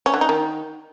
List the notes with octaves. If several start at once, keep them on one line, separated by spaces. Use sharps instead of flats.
C#4
D3
D#4
D#3